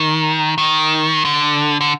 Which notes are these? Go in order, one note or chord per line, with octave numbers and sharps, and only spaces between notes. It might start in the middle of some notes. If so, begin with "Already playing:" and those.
Already playing: D#3
D#3
D3
D3